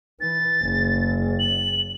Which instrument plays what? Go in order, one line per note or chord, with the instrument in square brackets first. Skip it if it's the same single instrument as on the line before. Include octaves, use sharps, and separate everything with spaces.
[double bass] E3 [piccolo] A6
[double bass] F#1
[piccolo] F#7